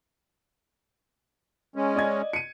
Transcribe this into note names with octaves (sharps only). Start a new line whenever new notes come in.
G#3 C#4
D5 D#5 G#6
C#7 D#7